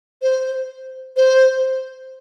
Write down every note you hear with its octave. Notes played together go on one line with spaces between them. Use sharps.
C5
C5